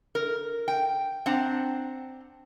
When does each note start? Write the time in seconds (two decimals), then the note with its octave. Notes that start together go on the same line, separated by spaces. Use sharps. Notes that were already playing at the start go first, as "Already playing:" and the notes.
0.15 A#4
0.68 G5
1.26 C4 D4 C5 F#5 A5 A#5